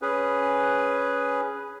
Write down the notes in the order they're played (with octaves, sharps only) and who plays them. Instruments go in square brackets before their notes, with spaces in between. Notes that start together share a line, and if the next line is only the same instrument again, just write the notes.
[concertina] C#4 G#4 B4